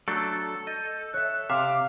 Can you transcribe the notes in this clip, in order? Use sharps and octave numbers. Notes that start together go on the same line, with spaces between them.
F#3 A3 D4 A4
D#5 G6
C#5 E5 F#6
C3 E5 F5 D6